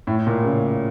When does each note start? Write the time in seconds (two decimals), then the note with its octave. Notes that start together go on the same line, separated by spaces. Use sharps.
0.07 A2
0.27 A#2
0.44 C#3